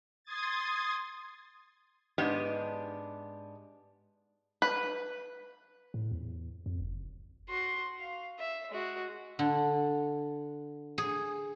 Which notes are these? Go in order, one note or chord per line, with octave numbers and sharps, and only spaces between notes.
C6 D#6 G#6 A6
G#2 B3 D4 G4 D#5
B4
A2
E2
F2
F#1
F#4 C6
F5
E5
G#3 F#4
D3
G#4